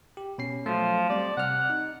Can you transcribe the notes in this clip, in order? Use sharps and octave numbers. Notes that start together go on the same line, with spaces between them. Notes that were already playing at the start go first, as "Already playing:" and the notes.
G4
B2 C#4 C7
F3 F#3 A3
G3 C4 D5
C3 F#5 F6
D#4